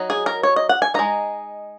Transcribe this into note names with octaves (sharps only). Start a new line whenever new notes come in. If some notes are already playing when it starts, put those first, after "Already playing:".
Already playing: F#3 D#4
G#4
A#4
C#5
D#5
F#5
G#5
G#3 D#4 A#5